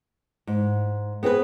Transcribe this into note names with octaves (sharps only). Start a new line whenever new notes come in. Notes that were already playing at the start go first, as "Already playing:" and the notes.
G#2
B3 C4 G#4 B4